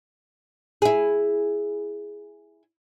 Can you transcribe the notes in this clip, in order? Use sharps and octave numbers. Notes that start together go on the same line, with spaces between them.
E4 G#4